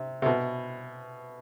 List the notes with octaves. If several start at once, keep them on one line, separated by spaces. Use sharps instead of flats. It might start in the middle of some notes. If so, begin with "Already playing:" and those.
Already playing: C3
C3
B2